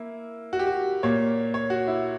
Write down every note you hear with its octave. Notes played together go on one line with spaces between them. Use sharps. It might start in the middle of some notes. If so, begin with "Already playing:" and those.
Already playing: A#3 E4
F#4
G4
F#4
A#2 A#3 C#5
C#5
F#4
E4